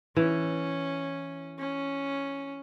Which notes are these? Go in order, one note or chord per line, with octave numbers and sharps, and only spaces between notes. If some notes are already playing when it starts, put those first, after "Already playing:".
E3 C#4
C#4